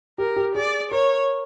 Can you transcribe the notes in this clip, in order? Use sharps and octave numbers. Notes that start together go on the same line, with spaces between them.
G4 A#4
G4
G#4 D5
A#4 C#5